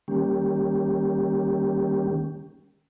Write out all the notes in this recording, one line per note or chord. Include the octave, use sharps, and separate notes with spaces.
D#3 G3 A#3 C#4 G4